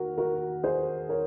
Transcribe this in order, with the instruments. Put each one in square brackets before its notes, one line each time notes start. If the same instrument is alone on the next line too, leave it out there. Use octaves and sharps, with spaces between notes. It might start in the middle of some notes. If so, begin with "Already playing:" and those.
Already playing: [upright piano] D#2 F#4 A#4
F#4 A#4
G#4 C5
A#4 C#5